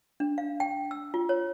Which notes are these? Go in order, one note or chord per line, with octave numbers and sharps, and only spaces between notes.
D4
F5
G5
E6
F4
C#5